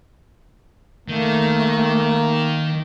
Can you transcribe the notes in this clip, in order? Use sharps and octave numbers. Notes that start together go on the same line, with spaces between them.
D#3 A3 A#3